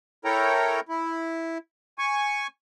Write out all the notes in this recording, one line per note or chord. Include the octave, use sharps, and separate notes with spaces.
E4 A4 A#4 C#5 G5 A#5
E4
G#5 C#6